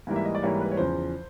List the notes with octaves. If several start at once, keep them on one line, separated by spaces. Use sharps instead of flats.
G#2 E3 G3 A#3
E5
D#5
D5
G#2 E3 G3 A#3 C#5
B4
C#5
E2 C#3 F3 C5